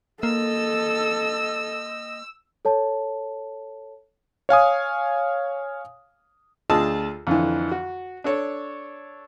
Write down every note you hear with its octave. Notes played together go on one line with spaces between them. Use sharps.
A#3 A4 D#5 E6
A4 C#5 A5
C#5 F5 G#5 D#6
D2 F4 G#4 D#5 A5 E6
F2 D3 E3
F#4
D4 A4 C#5